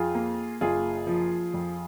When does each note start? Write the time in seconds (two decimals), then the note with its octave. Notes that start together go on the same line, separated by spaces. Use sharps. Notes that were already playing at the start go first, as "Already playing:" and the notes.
Already playing: F2 F4 G#4
0.15 A#3
0.61 F#1 F4 G#4
1.07 F3
1.54 F2